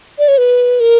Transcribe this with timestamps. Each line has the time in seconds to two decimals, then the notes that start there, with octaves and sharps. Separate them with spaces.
0.19 D5
0.28 C#5
0.38 B4
0.80 A#4